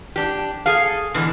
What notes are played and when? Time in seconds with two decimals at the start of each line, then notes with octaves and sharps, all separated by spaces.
0.16 D4 G4
0.66 G#4 A4 F5
1.14 B2 D3 E3